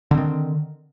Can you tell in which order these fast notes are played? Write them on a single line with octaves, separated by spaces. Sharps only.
D3 C4 D#3